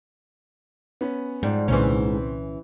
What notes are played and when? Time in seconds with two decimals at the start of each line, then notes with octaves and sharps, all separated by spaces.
1.01 B3 C#4
1.43 F2 G#2 G3
1.68 C2 A#2 D3 E3 C4 C#4 C5 C#6